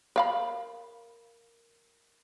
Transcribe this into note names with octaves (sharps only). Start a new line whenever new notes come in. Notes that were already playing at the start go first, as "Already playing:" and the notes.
A#4 F5 B5